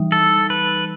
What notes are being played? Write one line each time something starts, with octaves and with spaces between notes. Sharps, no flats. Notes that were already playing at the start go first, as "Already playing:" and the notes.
Already playing: E3 G3 D#4
A4
B4